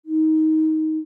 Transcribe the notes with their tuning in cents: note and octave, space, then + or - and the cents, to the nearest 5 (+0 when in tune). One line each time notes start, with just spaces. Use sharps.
D#4 +15